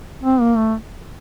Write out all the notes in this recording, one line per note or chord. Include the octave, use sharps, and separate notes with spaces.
C4
A#3
A3